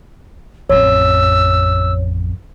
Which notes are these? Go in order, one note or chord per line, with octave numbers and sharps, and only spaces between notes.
A1 F2 C#5 E6